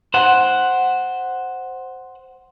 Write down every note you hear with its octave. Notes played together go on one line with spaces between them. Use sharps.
C5 F#5